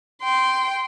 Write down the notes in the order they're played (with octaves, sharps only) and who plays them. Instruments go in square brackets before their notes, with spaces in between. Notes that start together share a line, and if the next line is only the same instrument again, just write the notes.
[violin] G5 C6